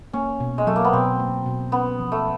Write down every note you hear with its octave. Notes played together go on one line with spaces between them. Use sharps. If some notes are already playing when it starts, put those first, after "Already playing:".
A#3 C#4
B2
G#3
F#3 A3
A#3
B3
B2 C4
A#3
B2
B3 C#4
F3
A3